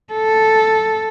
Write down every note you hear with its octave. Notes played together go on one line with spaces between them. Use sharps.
A4